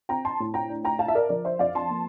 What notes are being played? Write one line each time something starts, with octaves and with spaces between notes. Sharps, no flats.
C4 G5 A#5
A5 C6
A2
G5 A#5
D4
G5 A#5
F4 F5 A5
E5
A#4 D5
F3 A#4 D5
C5 E5
F2 D5 F5
A5 C6
A#3